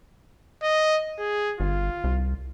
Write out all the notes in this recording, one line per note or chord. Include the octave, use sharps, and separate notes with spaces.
D#5
G#4
G1 F4
C2